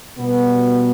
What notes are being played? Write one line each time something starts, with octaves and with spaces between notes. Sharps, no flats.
B2 G3 B3